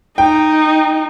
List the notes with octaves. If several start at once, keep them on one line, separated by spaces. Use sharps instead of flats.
D#4 G5